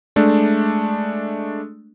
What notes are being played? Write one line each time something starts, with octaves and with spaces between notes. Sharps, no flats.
G#3 A3 D4